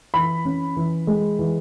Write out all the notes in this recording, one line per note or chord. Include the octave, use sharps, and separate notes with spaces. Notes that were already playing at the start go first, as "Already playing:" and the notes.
E3 B5
C#4
E3
G#3
E3